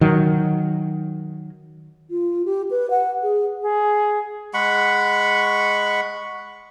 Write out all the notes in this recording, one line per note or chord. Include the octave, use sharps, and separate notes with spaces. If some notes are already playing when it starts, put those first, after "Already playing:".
D#3 F#3
F4
G4
B4
F#5
G#4
G#4
G#3 F#5 B5 C#6